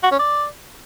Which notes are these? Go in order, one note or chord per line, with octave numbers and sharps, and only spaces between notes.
F#4
C#4
D5